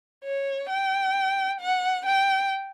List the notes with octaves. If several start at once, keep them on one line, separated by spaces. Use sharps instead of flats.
C#5
G5
F#5
G5